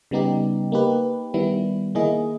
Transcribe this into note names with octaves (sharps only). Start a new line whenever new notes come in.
C#3 G3 B3 D#4 G4
A#3 D#4 G4 B4
D#3 G3 B3 E4
D#3 A#3 E4 G#4 D#5